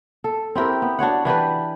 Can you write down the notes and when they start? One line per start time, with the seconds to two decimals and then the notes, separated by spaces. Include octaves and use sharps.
0.24 A4
0.55 C4 E4 G4 A#4
0.82 B3
0.99 D4 F#4 C#5 F#5
1.25 E3 D4 G4 B4